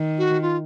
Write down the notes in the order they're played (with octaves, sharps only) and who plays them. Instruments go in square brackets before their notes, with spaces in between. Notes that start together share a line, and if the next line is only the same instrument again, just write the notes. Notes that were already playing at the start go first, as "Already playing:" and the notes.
Already playing: [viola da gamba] D#3
[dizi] F#4
F4